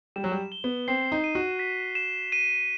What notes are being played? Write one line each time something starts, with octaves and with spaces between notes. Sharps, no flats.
G3 E7
F#3
G3
G7
B3
C4 C7
D#4
D#7
F#4
B6
E7
D#7